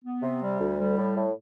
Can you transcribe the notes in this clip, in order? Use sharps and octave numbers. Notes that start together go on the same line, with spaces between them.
B3
C3
G3
D2
G3
A2
A2